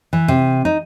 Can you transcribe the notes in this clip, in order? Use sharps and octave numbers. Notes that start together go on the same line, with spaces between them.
E3
C3
D#4